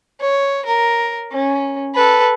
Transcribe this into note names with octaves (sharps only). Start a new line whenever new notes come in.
C#5
A#4
C#4
A4 B4